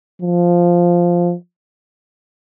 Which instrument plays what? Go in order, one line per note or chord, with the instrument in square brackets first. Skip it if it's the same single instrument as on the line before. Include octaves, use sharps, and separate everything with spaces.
[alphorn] F3